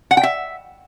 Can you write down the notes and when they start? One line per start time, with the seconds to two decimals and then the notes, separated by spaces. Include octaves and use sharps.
0.11 F#5
0.17 G5
0.23 E5